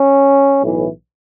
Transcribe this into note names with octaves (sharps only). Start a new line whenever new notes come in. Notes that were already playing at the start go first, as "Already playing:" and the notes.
Already playing: C#4
B1 A2 E3